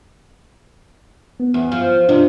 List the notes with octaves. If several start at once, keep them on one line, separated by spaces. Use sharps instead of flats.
B3
E2
F3 F5
C3 D4 F4 D#5